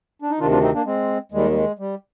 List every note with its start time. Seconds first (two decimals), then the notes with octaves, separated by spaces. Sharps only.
0.22 D4
0.31 D#4
0.39 D2 C3 D#3 D4 F4
0.51 D4 F4
0.62 C4 D#4
0.74 A#3 D4
0.85 G#3 C4
1.32 D#2 D#3 G3 G#3
1.50 G3
1.56 G#3
1.79 G3